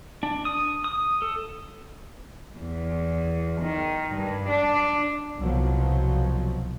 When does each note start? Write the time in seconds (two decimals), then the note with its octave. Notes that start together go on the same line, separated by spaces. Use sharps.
0.23 D4
0.45 D#6
0.84 D#6
1.22 A4
2.58 E2
3.61 D#3
4.15 G2
4.49 D4
5.39 C2 B2 F3 F#3